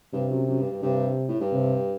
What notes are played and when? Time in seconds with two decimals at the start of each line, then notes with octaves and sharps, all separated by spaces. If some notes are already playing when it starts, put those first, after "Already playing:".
0.13 G2 C3
0.30 F#2
0.48 F#2
0.59 G2
0.71 G2
0.82 G2 C3
1.29 A2
1.40 G2
1.52 C3